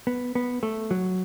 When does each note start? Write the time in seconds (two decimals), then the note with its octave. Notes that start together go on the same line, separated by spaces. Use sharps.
0.07 B3
0.35 B3
0.63 A3
0.91 F#3